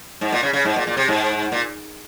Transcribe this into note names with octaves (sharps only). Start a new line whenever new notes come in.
G#2
A#2
C#3
C#3
G#2
A#2
A#2
C3
G#2
A#2